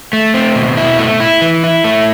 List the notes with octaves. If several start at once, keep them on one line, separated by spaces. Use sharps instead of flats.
A3
C4
B2
E4
A3
E4
E3
E4
A3